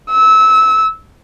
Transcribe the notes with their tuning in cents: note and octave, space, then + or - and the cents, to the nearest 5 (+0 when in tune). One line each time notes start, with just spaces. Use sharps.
E6 -25